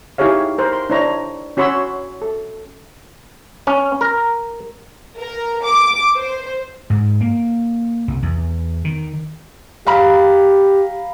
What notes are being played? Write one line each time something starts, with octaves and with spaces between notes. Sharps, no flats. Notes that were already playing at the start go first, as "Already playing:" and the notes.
D#4 E4 G4 G#4 C#5 F5
A#4 C5
C6
D4 E4 C5 C#5 A#5
C#4 F#4 C#5 B5 C6 E6
A4
C#4
A#4
A#4
D6
C5
G#2
A#3
C2
E2
D#3
G4 F5 A#5 B5